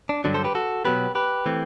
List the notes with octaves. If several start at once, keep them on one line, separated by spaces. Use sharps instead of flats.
D4
G2 D3 F#3 D4
A4 C5
G4 B4
F#4 A4
B2 F#3 B3 G4 B4
G4 B4
E3 A3 C4